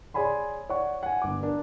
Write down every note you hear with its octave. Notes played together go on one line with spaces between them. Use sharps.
G#4 C#5 D5 G#5 B5 C6
C#5 D5 F#5 C#6
F#5 G#5
G1 D6
D4 A#4